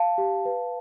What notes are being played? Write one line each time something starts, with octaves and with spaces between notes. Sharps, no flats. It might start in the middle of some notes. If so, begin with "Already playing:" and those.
Already playing: F5 A5
G4
B4